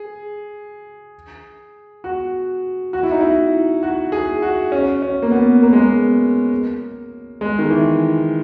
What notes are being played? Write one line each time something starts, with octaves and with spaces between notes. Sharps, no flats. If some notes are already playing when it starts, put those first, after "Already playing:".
Already playing: G#4
F#4
F#4
E4
D#4
E4
F#4
G#4
F#4
C#4
C#4
A#3
B3
A#3
G#3
A#3
G#3
D#3
E3